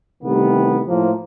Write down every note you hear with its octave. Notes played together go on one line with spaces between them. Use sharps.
C3 D#3 E3 G3 A3 B3
A2 F3 A#3